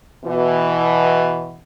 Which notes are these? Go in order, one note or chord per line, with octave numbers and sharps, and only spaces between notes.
B2 E3